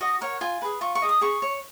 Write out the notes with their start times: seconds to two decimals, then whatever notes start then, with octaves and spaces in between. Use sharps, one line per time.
0.01 F#4 D#5
0.21 A#4 C#5 F#5
0.41 F4 G#5
0.62 G#4 B4
0.81 F4 C#6
0.95 C#6
1.02 G#4 D#5
1.09 D#6
1.21 G#4 C#6
1.42 C#5